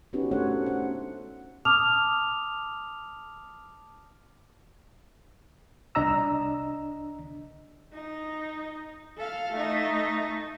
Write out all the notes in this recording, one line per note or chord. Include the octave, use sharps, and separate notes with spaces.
B3 C#4 D#4 F#4 G4 B4
A3 D4 A4 C5 C#5 F#5
C5 F#5
A5 D6 D#6 F6 F7
C2 D4 D#5 A#5 E6
D#4
A4 F5
A3 D#4